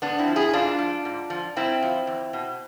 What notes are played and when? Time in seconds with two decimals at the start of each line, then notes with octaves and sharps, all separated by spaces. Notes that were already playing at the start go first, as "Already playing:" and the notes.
0.02 G#2 B3 D4
0.19 C4 E4
0.28 F3
0.36 E4 G#4
0.53 G#2 D4 F4
0.79 F3
1.05 G#2
1.30 F3
1.56 G#2 C4 E4
1.83 F3
2.07 E2
2.33 B2